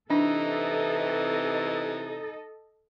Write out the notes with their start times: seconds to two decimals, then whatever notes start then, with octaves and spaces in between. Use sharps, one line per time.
0.10 C3 E3 D4 D#4 A4 D#5